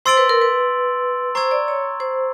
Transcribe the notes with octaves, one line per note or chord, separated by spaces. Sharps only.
C5 C6 E6 A6 D7 F#7
B4
A#4
B4
C5 A#5 C#6 E6 G#6
D5
C#5
C5